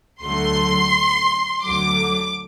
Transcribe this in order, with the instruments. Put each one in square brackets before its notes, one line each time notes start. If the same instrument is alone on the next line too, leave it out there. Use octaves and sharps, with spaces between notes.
[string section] D2 D3 F#3 A3 C6
D2 D3 F#3 D6